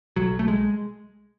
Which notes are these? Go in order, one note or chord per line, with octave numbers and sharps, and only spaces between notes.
B1 F#3
A3
G#3